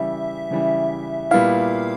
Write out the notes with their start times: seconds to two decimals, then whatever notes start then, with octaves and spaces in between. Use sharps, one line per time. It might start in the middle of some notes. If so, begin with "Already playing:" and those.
Already playing: C#3 E3 G3 E5
0.51 C#3 E3 G3
1.31 A#2 G3 B3 E4 F5